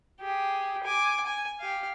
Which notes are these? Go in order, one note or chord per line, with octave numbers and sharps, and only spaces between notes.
G4 G#4
G#5 D6
G#5
G4 F5